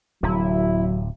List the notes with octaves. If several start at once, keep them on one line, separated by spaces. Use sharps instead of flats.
D1 C3 F#3 E4